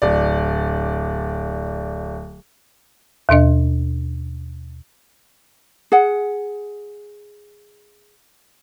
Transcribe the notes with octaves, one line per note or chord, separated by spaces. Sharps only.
D1 D5
D#2 B2 D4 D#5
G#4 F#5